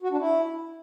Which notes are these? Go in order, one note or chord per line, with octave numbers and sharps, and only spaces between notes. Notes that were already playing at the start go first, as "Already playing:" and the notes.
F#4
D4
E4